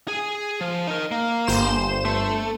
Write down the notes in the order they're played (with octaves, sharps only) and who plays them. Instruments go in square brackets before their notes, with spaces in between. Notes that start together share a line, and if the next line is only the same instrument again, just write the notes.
[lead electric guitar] G#4 G#5
F3
D#4 A#4
A#3
[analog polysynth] G1 C5 E7
[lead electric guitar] A3